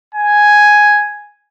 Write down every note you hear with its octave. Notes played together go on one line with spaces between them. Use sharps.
G#5